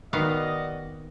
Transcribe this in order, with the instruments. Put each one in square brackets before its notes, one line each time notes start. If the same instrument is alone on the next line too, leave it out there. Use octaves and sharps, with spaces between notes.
[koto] D#3 B3 F5 [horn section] F#4 D5 D#5